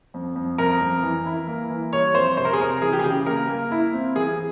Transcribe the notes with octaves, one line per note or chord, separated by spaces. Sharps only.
F2
F2
F2 A#4
F2
E3
E4
A#3
E3
G3 C#5
F2 C5
C3 C5
A#4
G#4
C3 A#4
E3 G#4
G4
G#4
C#3 G4
A#3 A#4
A#3
E4
C4
E3 G#4